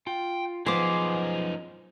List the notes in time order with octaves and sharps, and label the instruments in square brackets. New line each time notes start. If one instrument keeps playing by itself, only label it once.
[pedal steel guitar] F4 [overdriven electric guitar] G5
[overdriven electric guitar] F#2 D#4 [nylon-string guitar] F3 B3 [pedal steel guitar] G#4 C5 D6